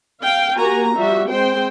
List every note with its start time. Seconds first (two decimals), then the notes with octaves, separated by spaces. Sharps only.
0.22 F5 G5
0.57 A#3 F#4 G4 G#5 A#5
0.97 F3 G3 F#4 E5
1.30 G#3 C4 C5 G5 C6